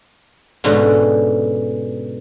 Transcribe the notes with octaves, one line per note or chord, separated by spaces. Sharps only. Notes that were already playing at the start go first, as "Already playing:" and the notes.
G#2 B2 D3 C#4